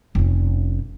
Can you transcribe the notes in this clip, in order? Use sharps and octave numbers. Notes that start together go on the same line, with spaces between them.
F1 C#4